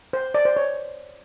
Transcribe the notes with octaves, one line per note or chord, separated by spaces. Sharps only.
C5
D5
C5
C#5